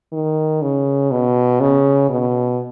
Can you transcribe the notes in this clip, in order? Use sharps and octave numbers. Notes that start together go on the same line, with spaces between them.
D#3
C#3
B2
C#3
B2